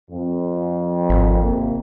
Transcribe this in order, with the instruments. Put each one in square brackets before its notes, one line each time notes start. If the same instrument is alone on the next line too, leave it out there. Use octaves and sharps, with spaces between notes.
[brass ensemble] F2
[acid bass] G#1
[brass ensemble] C3 A#3